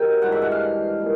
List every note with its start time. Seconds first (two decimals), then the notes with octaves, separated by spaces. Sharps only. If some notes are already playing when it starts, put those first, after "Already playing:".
Already playing: C3 D#3 F#3 G5
0.22 G2 E3 G#3 F#5
0.32 E5
0.42 F#5
0.51 F5
1.00 A#2